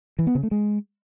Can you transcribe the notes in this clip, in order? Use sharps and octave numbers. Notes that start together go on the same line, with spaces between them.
E3
B3
C#3
A3
G#3